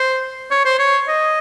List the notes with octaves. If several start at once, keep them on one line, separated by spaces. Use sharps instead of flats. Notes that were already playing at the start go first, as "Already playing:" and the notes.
Already playing: C5
C#5
C5
C#5
D#5